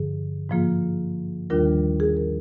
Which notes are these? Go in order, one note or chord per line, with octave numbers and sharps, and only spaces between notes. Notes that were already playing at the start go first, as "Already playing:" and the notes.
Already playing: G2 D3 F3 G#4
G#2 F3 A#3 F4
D#2 D#3 G3 D4 F4 A#4
G#4
A#4